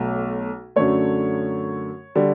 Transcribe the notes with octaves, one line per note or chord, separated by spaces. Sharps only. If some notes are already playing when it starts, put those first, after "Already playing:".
Already playing: B1 F#3 A3
F#2 D3 F#3 A3 C#5
D3 G3